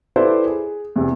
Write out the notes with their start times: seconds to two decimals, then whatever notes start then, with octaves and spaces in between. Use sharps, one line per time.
0.16 E4 G4 A4 B4 C5 D5
0.45 G#4
0.96 E2 C3